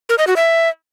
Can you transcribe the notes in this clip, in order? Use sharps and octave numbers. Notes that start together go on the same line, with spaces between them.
A#4
D#5
F#4
E5